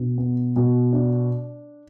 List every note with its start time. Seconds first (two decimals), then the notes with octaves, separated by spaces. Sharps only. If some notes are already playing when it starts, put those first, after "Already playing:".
Already playing: B2 D4
0.18 B3
0.56 B2
0.93 D4